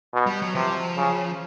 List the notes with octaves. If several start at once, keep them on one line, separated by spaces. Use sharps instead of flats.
B2
G3
F#3
C3 F3
C#3